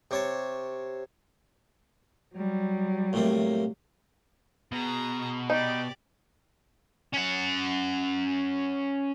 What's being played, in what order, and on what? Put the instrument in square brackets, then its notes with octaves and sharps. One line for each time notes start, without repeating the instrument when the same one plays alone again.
[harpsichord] C3 C#5 A5
[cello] F#3 G3
[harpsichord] A2 C3 A#3
[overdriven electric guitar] B2 [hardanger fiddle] G#4 A#5
[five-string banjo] D#4 [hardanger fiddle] G4 D5
[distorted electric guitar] C#4 F#5